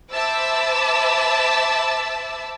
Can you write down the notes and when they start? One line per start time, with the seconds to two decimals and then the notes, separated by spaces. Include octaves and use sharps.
0.11 C5 E5 A5 B5 D6 E6